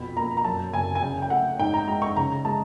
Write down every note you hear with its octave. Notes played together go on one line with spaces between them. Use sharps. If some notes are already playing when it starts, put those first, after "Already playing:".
Already playing: F2 B2 B5
A#3 A#5
A#5
F#2 A5
F#1 G#5
G#5
C#3 G5
G5
A3 F#5
G#2 G5
A#5
G#3 A#5
C#6
C#3 A#5
G#3 A5